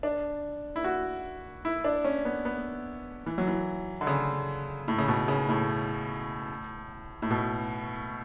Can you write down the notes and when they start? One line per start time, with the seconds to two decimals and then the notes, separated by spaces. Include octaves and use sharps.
0.03 D4
0.76 E4
0.84 F#4
1.65 E4
1.84 D4
2.05 C#4
2.25 B3
2.45 B3
3.26 E3
3.38 F#3
3.47 E3
4.01 D3
4.07 C#3
4.88 A2
4.98 C#3
5.08 B2
5.28 C#3
5.49 A2
7.22 A2
7.31 B2